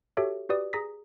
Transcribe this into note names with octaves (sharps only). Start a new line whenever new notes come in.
F#4 G4 A4 C#5 E5
F#4 G4 B4 D5 D#6
G#4 A#5 D#6 A#6 B6